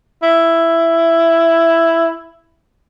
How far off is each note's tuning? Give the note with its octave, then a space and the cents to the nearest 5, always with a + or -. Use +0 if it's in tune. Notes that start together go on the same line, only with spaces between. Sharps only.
E4 +10